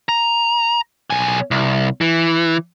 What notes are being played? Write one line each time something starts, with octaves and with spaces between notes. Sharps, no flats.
A#5
B1 G#5
C2
E3